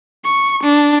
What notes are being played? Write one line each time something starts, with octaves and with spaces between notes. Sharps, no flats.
C#6
D4